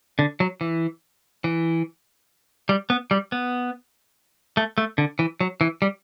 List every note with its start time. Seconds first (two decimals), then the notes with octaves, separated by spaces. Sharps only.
0.19 D3
0.40 F#3
0.61 E3
1.44 E3
2.69 G3
2.90 B3
3.11 G3
3.32 B3
4.57 A3
4.78 A3
4.98 D3
5.19 E3
5.41 F#3
5.61 E3
5.82 G3